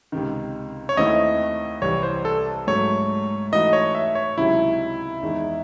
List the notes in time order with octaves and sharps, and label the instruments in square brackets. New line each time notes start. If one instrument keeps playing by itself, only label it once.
[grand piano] C#2 C3 D#3
[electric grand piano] C#5
[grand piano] D#2 D#3 A3 C4 E4 [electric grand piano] D#5
[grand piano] C2 C3 E3 [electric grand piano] C#5
[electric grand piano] C5
A4
[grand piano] G#2 F#3 A3 [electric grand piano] C#5
[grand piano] E3 A3 D#4 F#4 [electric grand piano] D#5
[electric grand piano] C#5
E5
C#5
[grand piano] C#2 C3 D#3 F#3 [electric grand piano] E4
[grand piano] E2 D#3 G#3 D#4